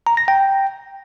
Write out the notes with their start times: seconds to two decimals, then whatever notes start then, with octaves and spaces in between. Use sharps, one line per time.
0.07 A#5
0.17 A#6
0.28 G5